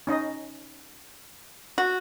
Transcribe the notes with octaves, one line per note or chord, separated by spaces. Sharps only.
C#4 D#4 D#5
F#4